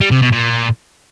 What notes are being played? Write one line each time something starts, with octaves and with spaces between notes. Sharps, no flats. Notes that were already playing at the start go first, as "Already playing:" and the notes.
G3
C3
B2
A#2